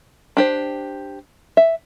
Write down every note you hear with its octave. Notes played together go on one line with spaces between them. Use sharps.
D4 G4 C5
E5